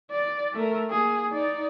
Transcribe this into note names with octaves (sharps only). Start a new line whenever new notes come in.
D5
A3 A#4
A#3 G#4
D#4 D5